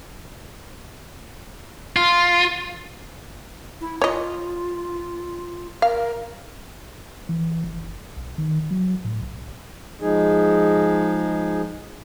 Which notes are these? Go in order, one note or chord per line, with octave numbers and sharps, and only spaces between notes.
F4
E4
F4 C#5 D#5
A#4 F5
E3
F#1
B1
D#3
F#3
A2
B1
F3 G#3 D#4 G#4